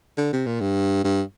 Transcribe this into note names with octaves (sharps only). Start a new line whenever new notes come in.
D3
C3
A#2
G2
G2